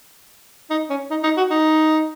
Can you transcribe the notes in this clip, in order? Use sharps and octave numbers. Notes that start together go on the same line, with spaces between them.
D#4
C#4
D#4
D#4
F#4
D#4